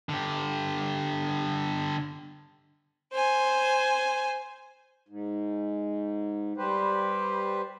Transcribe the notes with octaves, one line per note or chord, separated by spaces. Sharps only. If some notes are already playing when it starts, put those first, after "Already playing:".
D3 G4
C5 G#5
G#2
G3 G4 B4 C5